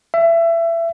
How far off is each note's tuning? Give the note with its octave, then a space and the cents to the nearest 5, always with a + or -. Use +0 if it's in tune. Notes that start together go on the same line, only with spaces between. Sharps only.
E5 +25